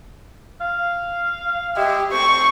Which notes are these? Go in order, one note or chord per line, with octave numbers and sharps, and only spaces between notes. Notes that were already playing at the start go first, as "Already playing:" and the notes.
F5
G#3 G4 E5
A3 C4 C5 C#6